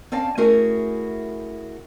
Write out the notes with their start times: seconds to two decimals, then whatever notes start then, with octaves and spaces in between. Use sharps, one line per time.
0.12 C4 C#4 D5 F5 A5
0.38 A3 C#4 E4 F#4 G#4 A#4